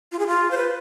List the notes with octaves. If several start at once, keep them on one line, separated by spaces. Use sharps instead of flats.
F4
G#4
F4
C5
B4